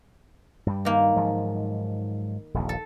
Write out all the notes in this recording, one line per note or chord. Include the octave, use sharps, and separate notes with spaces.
G2 G3
D#3 A#3
G#2 F3 F#3
D#1 A#1 D#2
A4